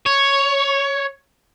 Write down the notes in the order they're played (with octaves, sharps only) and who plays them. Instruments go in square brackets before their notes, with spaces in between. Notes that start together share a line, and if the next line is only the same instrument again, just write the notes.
[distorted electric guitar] C#5